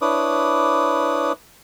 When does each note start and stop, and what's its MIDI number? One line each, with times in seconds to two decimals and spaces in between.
0.02 1.32 62
0.02 1.32 64
0.02 1.32 71
0.02 1.32 73
0.02 1.32 86
0.02 1.32 87